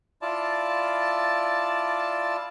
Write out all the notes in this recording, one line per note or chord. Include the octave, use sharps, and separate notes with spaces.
E4 F4 D5 A5